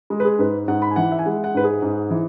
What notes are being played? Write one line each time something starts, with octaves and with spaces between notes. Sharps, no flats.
G#3 G#4
B4
G#4
G#2 B4
G#2 F#5
B5
G#5
E3 F#5
E5
G#5
G#3 F#5
F#5
G#2 B4
G#4
G#2
E3